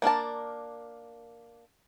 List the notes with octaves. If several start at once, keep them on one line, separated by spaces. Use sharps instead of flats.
A#3 D4 A#4 A5